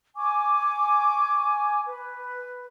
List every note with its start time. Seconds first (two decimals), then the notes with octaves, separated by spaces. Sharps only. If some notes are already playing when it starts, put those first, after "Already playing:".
0.16 G#5 C#6 D6
1.87 B4